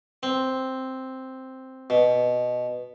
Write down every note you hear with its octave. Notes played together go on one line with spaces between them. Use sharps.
C4
B2